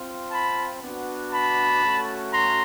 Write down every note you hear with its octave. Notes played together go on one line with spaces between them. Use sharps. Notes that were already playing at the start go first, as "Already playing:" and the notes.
Already playing: C4 F4
A5 B5
B3 D4 F#4
A5 B5
A3 C#4 F#4
A#5 C6